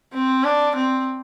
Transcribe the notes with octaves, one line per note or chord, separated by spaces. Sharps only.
C4
D4
C4